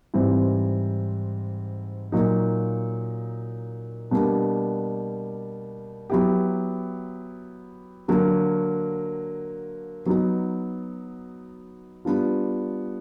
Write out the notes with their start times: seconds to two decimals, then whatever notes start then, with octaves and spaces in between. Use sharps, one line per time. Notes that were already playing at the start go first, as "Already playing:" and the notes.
0.14 G#2 E3 G3 C4
2.12 A#2 F#3 A#3 D#4
4.11 B2 G3 A#3 D4
6.10 F#3 B3 E4 G4
8.08 D3 F#3 A#3
10.06 F#3 B3 D#4 F#4
12.05 G3 B3 D4 F4